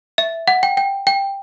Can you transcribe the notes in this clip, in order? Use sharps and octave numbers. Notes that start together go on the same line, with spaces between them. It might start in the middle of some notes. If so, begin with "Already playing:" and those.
E5
F#5
G5
G5
G5